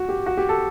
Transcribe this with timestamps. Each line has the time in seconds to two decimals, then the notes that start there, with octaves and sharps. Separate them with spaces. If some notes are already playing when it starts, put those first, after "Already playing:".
Already playing: F#4
0.09 G4
0.26 F#4
0.37 G4
0.49 A4